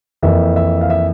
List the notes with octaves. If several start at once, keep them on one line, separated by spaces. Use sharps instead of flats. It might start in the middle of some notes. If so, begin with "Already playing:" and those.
F2 E3 A#3 E5
E5
F5
E5